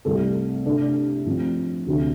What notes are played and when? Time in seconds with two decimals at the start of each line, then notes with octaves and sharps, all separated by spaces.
0.05 C2 C3 A3 C4 A4
0.66 C3 A3 D4 A4 D5
1.26 A2 F3 C4
1.86 D2 C3 A3 D4